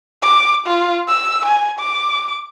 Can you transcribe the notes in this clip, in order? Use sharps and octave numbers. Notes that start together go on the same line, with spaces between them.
D6
F4
E6
G#5
D6